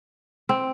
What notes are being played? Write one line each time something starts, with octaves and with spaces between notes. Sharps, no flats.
C4